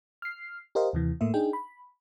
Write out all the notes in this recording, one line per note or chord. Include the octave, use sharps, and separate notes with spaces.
F6 C7
G4 A#4 C5 D#5 F5
D#2 C3 E3
A2 A3 A#3 E5
D4 D#4 G#4 G5
B5